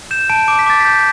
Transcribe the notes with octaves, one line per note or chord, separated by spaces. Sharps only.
G6 E7
A5 D7
D6 D7
B6
D6 A6
G6 B6